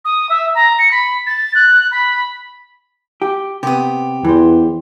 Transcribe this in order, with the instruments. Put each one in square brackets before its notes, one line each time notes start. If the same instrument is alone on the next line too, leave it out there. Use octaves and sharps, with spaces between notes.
[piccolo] D#6
E5
A#5
C#7
B5
A6
F#6
B5
[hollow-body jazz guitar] G4
[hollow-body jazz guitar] C3 B3 [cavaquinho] G4 D#6
[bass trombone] E2 [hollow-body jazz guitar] E3 C5